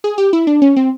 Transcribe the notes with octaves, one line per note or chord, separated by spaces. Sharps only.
G#4
G4
E4
D4
C#4
C4